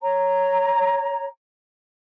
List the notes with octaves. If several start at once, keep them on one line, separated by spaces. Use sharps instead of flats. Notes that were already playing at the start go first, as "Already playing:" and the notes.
C#5 A#5